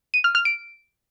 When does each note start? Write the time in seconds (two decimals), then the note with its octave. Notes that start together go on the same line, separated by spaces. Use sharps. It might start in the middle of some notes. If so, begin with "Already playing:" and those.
0.14 D#7
0.24 F6
0.35 F6
0.45 D7